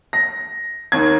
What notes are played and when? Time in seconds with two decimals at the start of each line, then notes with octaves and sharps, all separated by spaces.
0.13 A#6
0.92 D#2 D#3 G#6